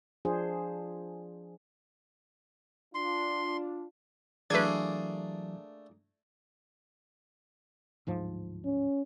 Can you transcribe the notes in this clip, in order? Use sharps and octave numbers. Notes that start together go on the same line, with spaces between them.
F3 D4 G#4 C5
D4 F4 C6
E3 F#3 A3 A#3 D4 G#4 B4 G#6
D1 G#2 F3
C#4